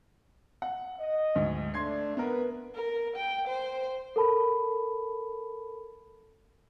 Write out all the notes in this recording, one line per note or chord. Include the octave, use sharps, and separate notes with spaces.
F#5
D#5
D2 G#2
A3 D4 C6 G#6 C7
B3 A#4 B4
A#4
G5
C5
A4 A#4 A5 B5